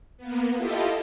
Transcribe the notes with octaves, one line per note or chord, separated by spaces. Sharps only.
A#3 B3
E4 F4 G4 A4 D#5